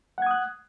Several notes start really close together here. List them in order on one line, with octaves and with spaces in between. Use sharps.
F#5 G#6 D#6 F#6